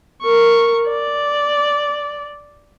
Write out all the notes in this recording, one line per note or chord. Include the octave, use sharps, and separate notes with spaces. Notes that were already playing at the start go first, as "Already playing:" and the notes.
A#4 C#6
D5